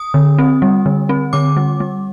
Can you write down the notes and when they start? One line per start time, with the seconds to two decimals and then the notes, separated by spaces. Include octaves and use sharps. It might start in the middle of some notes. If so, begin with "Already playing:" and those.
Already playing: D#6
0.14 D3
0.38 C4
0.62 G3
0.86 D3
1.09 C4
1.33 D3 D6
1.56 G3
1.80 G3